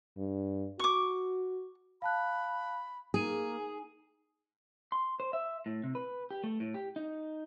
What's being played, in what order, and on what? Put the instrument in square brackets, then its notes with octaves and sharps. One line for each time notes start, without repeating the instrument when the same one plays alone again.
[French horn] G2
[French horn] F#4 [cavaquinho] C#6 D6
[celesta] F5 A5 F#6 [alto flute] B5
[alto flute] A#3 [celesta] D#4 G#5 D#7 [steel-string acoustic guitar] G#4
[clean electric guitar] C6
C5
E5
A2
C3
B4
G4
A3
A2
G4
D#4